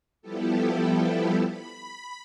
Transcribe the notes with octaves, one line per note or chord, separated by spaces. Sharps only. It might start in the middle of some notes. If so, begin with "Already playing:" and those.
F3 G3 B3 E4 G4 A4
B5